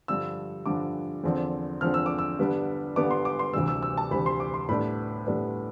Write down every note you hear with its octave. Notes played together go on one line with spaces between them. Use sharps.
G2 D3 F3 E6
G2 D3 F3 D6
E2 D3 F3 C4
E2 D3 F3 C4 F6
E6
D6
E6
G2 D3 G3 B3 D4
G2 D3 G3 B3 D4 D6
C6
D6
C6
D2 C3 E3 G3 E6
E6
E6
A5
D2 C3 E3 G3 B5
C6
D6
C6
A2 G3 B3 D4 B5
A2 G3 B3 D4